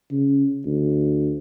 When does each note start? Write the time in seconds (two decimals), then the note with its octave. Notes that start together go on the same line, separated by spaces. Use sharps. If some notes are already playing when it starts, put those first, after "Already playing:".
0.12 C#3
0.65 D2